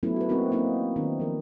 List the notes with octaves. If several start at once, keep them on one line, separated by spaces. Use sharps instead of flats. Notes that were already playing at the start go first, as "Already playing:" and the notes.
F#3 A3 B3 C#4 E4 F4
F#4 B4
A#3 C4 D#4 F#4 A#4
A#3 C4 D#4 E4
D#3 C4 D4 D#4
F3 A#4